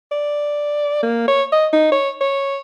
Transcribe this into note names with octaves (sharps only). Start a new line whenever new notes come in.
D5
A#3
C#5
D#5
D#4
C#5
C#5